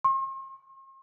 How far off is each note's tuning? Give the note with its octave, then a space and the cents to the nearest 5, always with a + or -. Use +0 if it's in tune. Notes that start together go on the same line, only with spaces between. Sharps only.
C6 +45